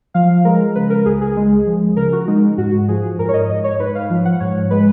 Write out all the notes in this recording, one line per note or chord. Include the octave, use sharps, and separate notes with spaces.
F3 F5
G#3 A#4
C#3 B4
A#4
C#2 G#4
G#4
G#3
F3
C#3 A#4
F#4
G#3 D#4
G#2 F#4
F3 G#4
G#2 A#4
C#5
D#5
G#2 D#5
C#5
G#2 B4
F5
F3
F#5
G#2 C#5
G#3 B4